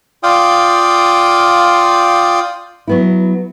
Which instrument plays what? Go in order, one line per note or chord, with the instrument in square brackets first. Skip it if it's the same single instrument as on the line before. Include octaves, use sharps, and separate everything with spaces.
[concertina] F4 D5 F5 G5 D#6
[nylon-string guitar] F#3 B3 E4